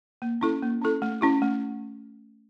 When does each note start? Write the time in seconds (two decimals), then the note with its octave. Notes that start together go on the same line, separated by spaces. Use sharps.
0.22 A#3
0.41 C#4 E4 A4
0.62 A#3
0.82 C#4 E4 A4
1.02 A3
1.21 C#4 E4 G4
1.42 A3